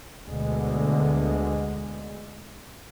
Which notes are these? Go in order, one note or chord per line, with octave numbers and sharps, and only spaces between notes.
D2 B2 D3 G#3